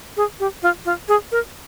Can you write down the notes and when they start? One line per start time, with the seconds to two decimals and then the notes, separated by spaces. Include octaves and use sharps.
0.17 G#4
0.40 G4
0.63 F4
0.85 F4
1.08 G#4
1.32 A#4